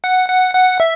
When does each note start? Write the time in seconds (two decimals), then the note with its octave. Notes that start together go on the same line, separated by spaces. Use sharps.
0.04 F#5
0.29 F#5
0.54 F#5
0.80 E5